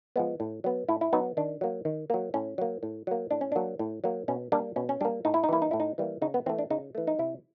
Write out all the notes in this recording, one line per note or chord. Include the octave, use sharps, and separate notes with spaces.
F3 G#3 B3
A2
F#3 B3
A2 E4
E4
F#3 B3 D#4
D#3 D4
F#3 A#3
D#3
F#3 A#3
A2 C#4
F#3 A#3
A2
F#3 A#3
A2 D4
C#4
F#3 A#3 D4
A2
F#3 A#3
B2 C#4
G3 A#3 D4
B2 C#4
C#4
G3 A#3 D4
A2 D#4
E4
D#4
E3 G3 A#3 E4
D#4
A2 E4
D#4
E3 G3 A#3
C#3 D#4
B3
E3 A3 C4
D4
C#3 D#4
E3 A3
D#4
C3 E4